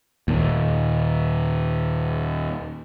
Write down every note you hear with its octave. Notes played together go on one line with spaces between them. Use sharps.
D#2 A#2